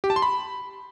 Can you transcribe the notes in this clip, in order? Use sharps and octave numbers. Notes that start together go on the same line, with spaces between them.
G4
A5
C6
B5